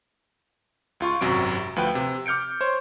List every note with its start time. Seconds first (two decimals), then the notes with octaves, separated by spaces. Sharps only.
1.00 C#2 F4 C#6
1.21 G#1 F#2 C3 F#3 C#6 D7
1.76 D2 F3 B4 G5
1.95 C3
2.26 D6 F6 G6 C#7 D7
2.61 C5 C#5